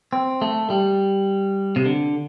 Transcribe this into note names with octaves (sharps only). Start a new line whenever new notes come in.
C4
A3
G3
C3
D3